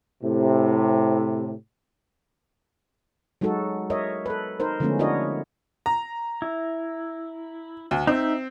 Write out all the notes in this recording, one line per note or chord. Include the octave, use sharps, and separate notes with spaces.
A2 C3
F#3 G#3 D#4 F#4 A4
A#4 C#5 D#5 E5
A4 B4
D#4 A#4 C5
D3 F3 G#3 A3 B3 C#4
D4 E4 F#4 A#4 C#5 D#5
A#5
E4
D2
C4 D#4 E5